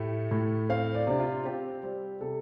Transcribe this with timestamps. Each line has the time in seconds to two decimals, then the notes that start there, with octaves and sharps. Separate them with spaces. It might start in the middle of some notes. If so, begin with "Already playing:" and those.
Already playing: A2 A3 G4
0.31 A2
0.69 C4 F5
0.95 D5
1.07 C3 D4
1.20 F4
1.45 C4 G4
1.83 G3
2.21 C3 A4